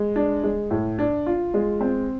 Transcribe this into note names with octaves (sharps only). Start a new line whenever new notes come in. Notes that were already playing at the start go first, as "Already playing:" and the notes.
Already playing: G#3
D4
G#3
A2
D4
F4
G#3
C4